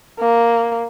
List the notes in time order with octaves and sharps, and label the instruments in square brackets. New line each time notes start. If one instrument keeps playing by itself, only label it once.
[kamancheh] A#3